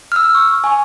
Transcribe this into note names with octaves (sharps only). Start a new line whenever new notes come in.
E6 F6
C#6
G#5 C#6